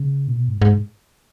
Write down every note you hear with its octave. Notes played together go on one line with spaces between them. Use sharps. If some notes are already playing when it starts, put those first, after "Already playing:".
Already playing: C#3
A#2
B2
G#2
G#2